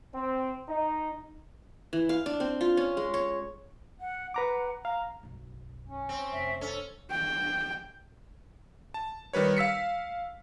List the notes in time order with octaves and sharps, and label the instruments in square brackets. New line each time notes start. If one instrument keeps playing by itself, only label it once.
[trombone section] C4
D#4
[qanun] E3
F5
D4
C4
F4
C#4
G#3
C#5
[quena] F#5
[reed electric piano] B4 A#5 D6 [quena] F#5
[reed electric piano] F5 [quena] A#5
[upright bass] B1 F#2
[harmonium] C#4
[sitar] C4
[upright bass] F1 [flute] E5
[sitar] C#4 [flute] A4
[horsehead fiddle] G5
[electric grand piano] A5
D#3 G3 B4 C#5
F5 E6 B6 C#7